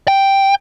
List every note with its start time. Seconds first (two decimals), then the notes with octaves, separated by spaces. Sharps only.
0.08 G5